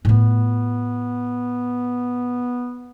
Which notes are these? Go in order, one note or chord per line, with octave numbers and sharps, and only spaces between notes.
A2 B3 F4